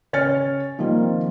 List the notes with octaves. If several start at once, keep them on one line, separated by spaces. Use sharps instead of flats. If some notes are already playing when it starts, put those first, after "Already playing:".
C#3 C#5 G#5 F6 A6 C#7
C3 D#3 F3 G3 A#3